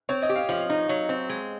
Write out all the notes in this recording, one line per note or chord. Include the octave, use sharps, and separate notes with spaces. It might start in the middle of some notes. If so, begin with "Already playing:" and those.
C4 C#5
D#5
G4
F5
F3 F5
D#4
F#3
C4
G#3